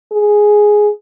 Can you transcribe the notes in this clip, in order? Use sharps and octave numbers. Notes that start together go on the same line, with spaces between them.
G#4